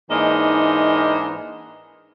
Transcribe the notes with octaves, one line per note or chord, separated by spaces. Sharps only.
G#2 E3 A#3 D4 D#4 D#5